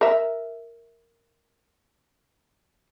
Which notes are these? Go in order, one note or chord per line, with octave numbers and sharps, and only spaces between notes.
A#4 E5